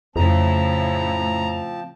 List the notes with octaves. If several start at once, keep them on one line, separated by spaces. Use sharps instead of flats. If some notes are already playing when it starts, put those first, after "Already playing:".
F2 A2 C#3 F3 C4 E4 A5 A#5